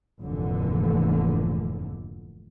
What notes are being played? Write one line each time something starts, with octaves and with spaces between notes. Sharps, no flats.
F1 D#2 G#2 D3 E3